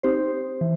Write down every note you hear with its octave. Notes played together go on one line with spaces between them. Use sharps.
C4 D#4 G4 C5
E3